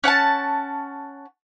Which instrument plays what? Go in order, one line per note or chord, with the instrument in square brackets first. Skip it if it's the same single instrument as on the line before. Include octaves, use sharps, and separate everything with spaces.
[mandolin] C#4 F#5 G5 A5